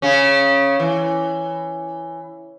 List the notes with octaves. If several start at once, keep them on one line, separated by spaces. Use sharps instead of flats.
C#3 C#4
E3